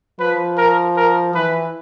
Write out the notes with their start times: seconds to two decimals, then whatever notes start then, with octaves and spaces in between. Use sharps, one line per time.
0.19 F3 B4
0.57 A#4
0.96 A#4
1.35 E3 B4